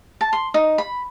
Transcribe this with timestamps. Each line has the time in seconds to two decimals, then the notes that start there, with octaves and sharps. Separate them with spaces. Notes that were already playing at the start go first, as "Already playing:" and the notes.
0.21 A5
0.33 C6
0.54 D#4
0.78 B5